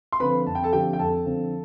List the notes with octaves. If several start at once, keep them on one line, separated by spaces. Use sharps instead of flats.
C6
D3 F3 C4 B4 B5
F2 A5
G5
A4 A5
D3 F3 C4 G4 G5
G5
F2 A4 A5
D3 F3 C4